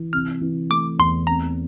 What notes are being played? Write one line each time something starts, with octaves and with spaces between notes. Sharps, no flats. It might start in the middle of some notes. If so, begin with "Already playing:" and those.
Already playing: E3
C3 F6
E3
A3 D6
E2 C6
C4 A#5